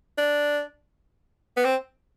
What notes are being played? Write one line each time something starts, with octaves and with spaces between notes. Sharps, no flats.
D4
B3
C4